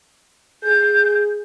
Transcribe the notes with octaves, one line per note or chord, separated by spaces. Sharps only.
G#4 G6